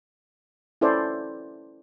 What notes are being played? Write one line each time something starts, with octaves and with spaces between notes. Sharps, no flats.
C#4 E4 A4 C5 D5